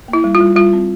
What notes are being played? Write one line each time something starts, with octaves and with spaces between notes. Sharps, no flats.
A#3
E4
G3
F4
G3
G3 F4
C4